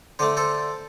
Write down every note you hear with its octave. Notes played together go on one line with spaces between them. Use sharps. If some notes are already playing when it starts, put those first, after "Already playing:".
D3 A3 C5
A4 C5